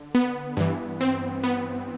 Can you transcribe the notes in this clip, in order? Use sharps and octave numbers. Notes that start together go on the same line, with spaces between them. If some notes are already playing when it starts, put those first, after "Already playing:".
Already playing: D3
B3
G2 E3
C4
B3